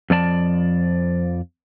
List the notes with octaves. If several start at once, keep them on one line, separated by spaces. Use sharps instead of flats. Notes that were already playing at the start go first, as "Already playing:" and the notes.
F2 F3 D5 A5